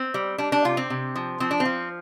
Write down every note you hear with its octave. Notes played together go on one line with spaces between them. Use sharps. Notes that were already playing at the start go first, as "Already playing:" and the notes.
Already playing: C4
G3
G3 D4
D4
C3 F4
C4
C3
F3
F3 C4
D4
C4
F3